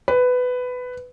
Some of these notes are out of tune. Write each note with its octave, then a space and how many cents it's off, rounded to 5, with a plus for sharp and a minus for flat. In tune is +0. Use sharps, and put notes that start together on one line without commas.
B4 +15